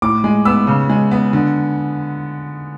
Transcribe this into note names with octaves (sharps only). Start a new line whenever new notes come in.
A2 D6
G#3
B3 E6
C#3
G#3
B3
D3